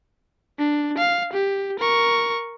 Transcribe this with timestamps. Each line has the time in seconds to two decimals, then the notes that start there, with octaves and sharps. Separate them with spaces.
0.59 D4
0.98 F5
1.33 G4
1.80 A#4 C#6